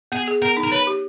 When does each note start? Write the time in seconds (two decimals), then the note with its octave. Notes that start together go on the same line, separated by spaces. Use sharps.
0.12 B3 G#4
0.28 G#4
0.42 B3 A#4
0.57 D#4
0.63 A#4
0.72 B4 C#5
0.87 G4